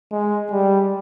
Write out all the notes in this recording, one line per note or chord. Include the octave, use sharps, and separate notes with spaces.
G#3
G3